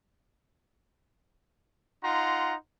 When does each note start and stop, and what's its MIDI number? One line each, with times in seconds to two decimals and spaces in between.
2.04 2.55 63
2.04 2.55 65
2.04 2.55 78
2.04 2.55 82
2.04 2.55 84